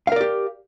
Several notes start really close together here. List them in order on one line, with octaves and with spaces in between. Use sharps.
F5 A#4 D5 G4